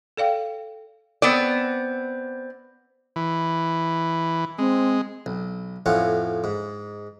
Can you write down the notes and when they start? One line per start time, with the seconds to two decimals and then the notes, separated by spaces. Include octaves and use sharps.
0.17 A4 D5 F5 G5
1.22 B3 C4 D5
3.16 E3
4.59 G#3 C4
5.26 B1
5.86 F2 A2 C#4 F4 F#5
6.44 G#2